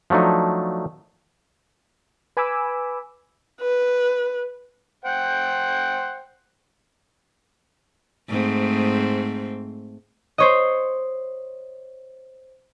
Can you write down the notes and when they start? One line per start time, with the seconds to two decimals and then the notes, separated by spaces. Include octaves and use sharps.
0.10 F3 F#3 A3 D4 D#4
2.37 B4 G#5 B5 D6 E6
3.61 B4
5.05 C5 F#5 G5
8.28 G#2 A3 C4
10.38 C5 C#5 D#5